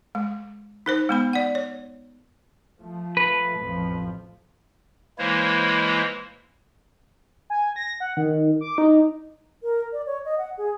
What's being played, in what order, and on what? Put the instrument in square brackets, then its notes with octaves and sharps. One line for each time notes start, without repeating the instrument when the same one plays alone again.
[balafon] G#3
D#4 A#4 C5
G#3 B3 B5
D5 F#5
C#5
[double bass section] F3 A3
[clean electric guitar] B4
[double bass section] A1 F2 F3
[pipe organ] E3 G#3 A#3 E4 C5 C#5
[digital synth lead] G#5
A#6
F#5
D#3
D6
D#4
[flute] A#4
D5
C#5
D#5
F#5
G#4